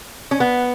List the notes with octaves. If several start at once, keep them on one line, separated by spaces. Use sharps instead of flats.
C#4
B3